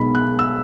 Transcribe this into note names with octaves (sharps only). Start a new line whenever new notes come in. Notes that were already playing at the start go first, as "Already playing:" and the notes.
Already playing: B1 B2 G#3 B5
F#6
E6